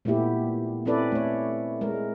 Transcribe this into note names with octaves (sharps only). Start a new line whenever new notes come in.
A#2 A3 B3 E4 G4
C4 C#4 E4 A4 B4 D5
A3 C#5
G#3 A#4